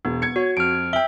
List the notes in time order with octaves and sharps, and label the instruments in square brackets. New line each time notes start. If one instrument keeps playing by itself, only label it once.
[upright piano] E1 [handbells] B3
[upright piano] G#6 C#7
[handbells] F#4 [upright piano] C#5
[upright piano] F2 [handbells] F6 D7
[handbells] E5 [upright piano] G5 G7